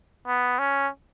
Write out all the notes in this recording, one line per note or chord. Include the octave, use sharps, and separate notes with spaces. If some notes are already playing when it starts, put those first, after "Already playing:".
B3
C#4